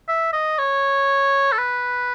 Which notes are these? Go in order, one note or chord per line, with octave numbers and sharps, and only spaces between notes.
E5
D#5
C#5
A4
B4